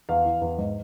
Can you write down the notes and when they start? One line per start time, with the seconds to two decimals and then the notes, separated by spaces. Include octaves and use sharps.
0.09 E2 F5
0.25 E3
0.42 E2
0.58 G#2